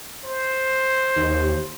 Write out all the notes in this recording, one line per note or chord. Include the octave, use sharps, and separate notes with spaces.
C5
D#2